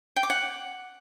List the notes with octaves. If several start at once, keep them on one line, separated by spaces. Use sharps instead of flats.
G5
D6
F#5